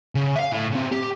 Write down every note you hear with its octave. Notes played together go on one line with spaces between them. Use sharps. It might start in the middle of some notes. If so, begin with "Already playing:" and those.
C#3
E5 F5
A2
C#3 C4
G4